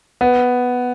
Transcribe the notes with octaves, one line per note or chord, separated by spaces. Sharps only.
B3